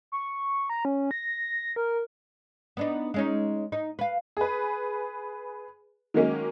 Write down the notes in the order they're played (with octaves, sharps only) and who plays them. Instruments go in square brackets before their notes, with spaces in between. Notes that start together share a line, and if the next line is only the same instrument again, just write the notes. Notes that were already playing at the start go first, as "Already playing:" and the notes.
[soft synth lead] C#6
A#5
C#4
A#6
A#4
[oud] B3 D4 D#4
G#3 C#4 D#4
D#4
B4 F5
[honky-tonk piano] G#4 B4
D#3 F#3 G#3 A#3 C#4